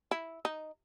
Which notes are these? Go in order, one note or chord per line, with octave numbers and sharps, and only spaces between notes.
E4
D#4